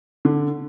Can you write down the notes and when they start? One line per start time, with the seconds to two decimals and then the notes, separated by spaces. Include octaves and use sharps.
0.25 D3